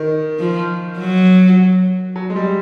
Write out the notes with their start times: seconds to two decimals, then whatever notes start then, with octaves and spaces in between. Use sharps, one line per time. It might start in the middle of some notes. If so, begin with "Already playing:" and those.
Already playing: D#3
0.39 F3
0.98 F#3
2.16 F#3
2.30 G#3
2.36 G3